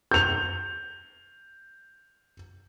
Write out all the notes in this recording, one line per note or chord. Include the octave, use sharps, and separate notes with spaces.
G6 F7